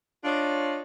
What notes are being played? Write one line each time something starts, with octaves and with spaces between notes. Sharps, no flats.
D4 F4 C#5 D#5